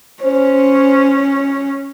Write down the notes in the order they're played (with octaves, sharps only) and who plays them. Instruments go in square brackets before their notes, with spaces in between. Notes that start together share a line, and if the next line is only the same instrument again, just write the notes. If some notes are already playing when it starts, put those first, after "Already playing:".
[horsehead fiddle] C#4 [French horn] C5